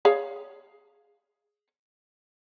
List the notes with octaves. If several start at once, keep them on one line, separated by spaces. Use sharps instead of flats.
G#4 C#5 F5